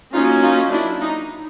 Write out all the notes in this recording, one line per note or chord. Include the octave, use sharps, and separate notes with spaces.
F#3 A#3 C#4 D#4 F4
D#4 F4
D4 E4
D#4